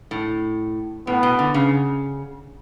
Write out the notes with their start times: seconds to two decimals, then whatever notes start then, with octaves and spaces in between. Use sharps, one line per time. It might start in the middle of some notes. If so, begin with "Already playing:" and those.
0.11 A2
1.07 A2 B3
1.23 B2
1.39 D3
1.54 C#3